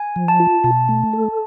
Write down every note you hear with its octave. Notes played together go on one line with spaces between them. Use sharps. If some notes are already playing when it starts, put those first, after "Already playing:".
Already playing: G#5
F3
A5
F4
B2 A5
A3
A4